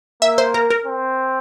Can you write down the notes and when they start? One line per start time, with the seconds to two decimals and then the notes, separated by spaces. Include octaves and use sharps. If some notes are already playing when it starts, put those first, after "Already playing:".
0.22 A#3 E5
0.38 C5
0.54 A#4
0.70 A#4
0.86 C4